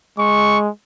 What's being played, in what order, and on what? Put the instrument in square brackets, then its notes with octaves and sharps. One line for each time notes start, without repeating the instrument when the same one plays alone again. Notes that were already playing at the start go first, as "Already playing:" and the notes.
[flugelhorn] G#3 [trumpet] C#6